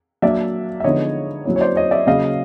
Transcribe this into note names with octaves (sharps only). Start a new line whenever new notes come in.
F#3 A#3 D4 D5 E5
E5
D3 F3 G#3 B3 D#4 C#5 D#5
F#3 A#3 C#4 E4 C#5
C#5
C5 D5
C#5 D#5
D5 E5
C#3 F#3 A#3 C#4 D#5 F5